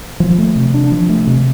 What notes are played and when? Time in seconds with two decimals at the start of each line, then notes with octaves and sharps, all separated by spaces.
0.20 F3
0.38 A3
0.56 C3
0.74 D4
0.92 F3
1.09 A3
1.27 C3